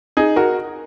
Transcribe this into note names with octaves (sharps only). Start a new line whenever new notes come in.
D#4 G#4
F#4 A#4